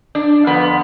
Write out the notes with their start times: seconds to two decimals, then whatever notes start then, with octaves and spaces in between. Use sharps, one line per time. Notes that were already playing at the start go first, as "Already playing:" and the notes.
0.15 D4
0.46 F2 D3 F3 B3